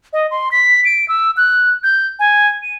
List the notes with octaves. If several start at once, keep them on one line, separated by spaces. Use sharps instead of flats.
D#5
C6
B6
D7
E6
F#6
G6
G#5
D#7